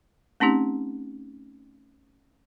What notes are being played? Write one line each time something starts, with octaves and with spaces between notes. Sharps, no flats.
A3 C4 C#4 D#4 G4